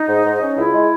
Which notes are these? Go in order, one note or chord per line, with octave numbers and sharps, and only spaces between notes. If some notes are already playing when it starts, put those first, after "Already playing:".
Already playing: D#4
G#2
G#2
C#4
C#2 E4
G#3